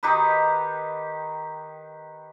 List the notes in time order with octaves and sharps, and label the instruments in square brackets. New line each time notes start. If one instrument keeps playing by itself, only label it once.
[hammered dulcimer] D#3 D#4 G4 B4